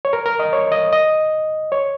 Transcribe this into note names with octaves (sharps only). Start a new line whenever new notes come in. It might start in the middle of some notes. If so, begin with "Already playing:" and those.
C#5
A#4
A#4
D#5
C#5
D#5
D#5
C#5